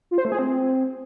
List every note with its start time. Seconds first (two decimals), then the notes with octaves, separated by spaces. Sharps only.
0.11 F4
0.18 C5
0.25 A3
0.32 G#4
0.39 C4